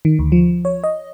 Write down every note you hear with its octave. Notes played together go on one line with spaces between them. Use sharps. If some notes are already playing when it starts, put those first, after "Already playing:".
D#3
D2
F3
C#5
D#5